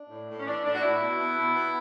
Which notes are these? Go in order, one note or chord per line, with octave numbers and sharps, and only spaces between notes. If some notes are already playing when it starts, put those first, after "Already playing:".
Already playing: D4
A2
A2
C#4
E3 D4
A2 D4
F#4
A2 E4
B2
B3
B2
B3